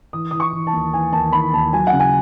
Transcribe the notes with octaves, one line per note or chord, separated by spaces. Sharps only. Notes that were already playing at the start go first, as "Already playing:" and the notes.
E3 D#6
E3 D#6
C#6
E3
A5
D#2
E3 G#5
D#2 A5
D#2 B5
D#2 A5
F#3 G#5
F#5
C#3
G#5